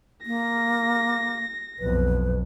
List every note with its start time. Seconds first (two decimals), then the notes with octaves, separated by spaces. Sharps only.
0.26 A#3 A#6
1.79 B1 F2 B4